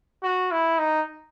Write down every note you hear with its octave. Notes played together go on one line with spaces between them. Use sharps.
F#4
E4
D#4